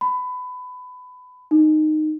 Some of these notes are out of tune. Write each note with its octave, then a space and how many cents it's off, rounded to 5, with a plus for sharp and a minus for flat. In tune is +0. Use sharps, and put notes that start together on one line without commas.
B5 +20
D#4 -15